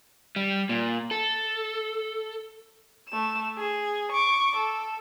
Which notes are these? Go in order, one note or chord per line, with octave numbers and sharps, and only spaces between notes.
G3
A#2
A4
A3 E7
G#4
C#6 D6
A4